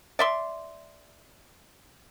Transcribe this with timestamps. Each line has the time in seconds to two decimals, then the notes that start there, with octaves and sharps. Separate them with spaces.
0.19 D5 E5 C6